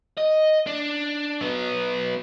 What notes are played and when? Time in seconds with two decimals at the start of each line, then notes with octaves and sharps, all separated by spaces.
0.17 D#5
0.67 D4
1.41 F#3 B3